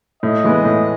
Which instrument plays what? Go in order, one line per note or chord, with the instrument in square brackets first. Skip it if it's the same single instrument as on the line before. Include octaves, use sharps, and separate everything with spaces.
[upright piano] A2 [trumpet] D#5
[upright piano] E3 G#3 B3
A2